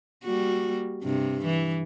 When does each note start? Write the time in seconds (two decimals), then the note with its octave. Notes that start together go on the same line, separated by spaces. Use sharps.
0.24 G3 A#3 F#4
1.03 G2 C3
1.45 E3